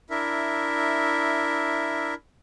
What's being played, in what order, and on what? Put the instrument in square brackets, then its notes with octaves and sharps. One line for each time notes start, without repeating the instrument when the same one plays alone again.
[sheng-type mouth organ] D4 E4 A#4 E5